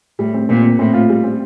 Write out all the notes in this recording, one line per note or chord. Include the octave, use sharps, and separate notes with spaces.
A2 G3
C4
A#2 C4
C4
A2 C4
F4
G3
C4